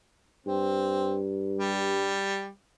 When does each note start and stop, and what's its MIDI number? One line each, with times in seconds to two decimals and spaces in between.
0.47 2.24 43
0.47 1.17 60
1.58 2.48 55